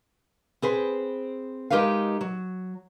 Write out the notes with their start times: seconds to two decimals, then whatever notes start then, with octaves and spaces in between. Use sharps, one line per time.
0.62 C4 G#4 B4 C5
1.70 G#3 D#4 G4 A#4 B4 F5
2.21 F#3